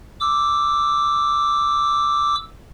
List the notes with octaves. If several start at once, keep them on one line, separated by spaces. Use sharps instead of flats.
D6 E6